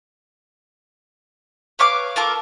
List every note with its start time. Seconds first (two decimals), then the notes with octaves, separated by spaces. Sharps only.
1.79 B4 C#5 F5 D6
2.16 A#3 F4 A4 A#4